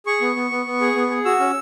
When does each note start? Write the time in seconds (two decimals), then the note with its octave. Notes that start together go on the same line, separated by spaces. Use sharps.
0.06 G#4 C#6
0.21 B3
0.36 B3
0.51 B3
0.66 B3
0.81 G#4
0.96 B3
1.10 G#4
1.25 F#4 E6
1.40 C#4